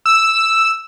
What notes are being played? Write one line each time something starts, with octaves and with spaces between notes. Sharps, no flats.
E6